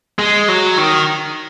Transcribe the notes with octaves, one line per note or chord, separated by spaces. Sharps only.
G#3
F#3
D#3